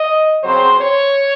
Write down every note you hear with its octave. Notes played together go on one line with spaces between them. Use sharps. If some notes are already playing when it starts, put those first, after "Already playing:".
Already playing: D#5
C#3 F#3 C4 C5
C#5